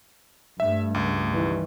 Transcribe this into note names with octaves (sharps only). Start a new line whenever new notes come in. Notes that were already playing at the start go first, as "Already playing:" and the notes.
G2 A3 E5
C#2
D#3 E3 G3